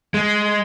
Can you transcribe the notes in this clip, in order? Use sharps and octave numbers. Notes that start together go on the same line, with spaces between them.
G#3